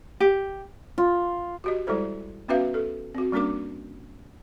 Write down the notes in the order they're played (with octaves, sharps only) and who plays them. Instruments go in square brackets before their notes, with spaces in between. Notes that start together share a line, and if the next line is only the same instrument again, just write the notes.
[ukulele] G4
[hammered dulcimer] F4
[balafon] F#4 G4 D#5
G3 G#3 E4 A4 C5
B3 C#4 F#4 B4 E5 F5
A4
C4 F#4
G3 A#3 C#4 D4 A#4 D6